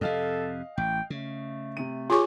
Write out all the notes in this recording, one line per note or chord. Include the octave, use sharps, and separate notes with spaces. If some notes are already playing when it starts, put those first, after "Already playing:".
F2 C3 A4 D#5 F5
A1 G5
C#3 A3
C3 D#7
F4 G4 G#4 C#5 G#5 C#6